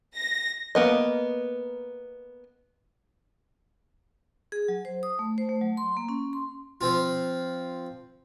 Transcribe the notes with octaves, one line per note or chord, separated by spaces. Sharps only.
A#6
A#3 B3 D#5
G#4
F#3
C5
D#6
A3
C5
A3
F#3
C6
A#3
C#4
C6
F3 C4 F4